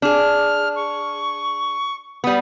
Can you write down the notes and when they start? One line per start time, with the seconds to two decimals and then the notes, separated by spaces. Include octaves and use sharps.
0.02 D4 G#4 F6
0.76 C#6
2.24 G3 B3 D#6